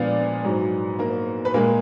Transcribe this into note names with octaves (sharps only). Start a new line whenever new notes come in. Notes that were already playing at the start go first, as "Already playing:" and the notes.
Already playing: A#2 F3 G#3 B3 D4 D5 F5
G#2 F#3
A#3 A#4
B4
A#2 G#3 A#3 A#4